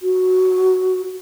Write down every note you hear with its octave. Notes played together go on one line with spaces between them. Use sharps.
F#4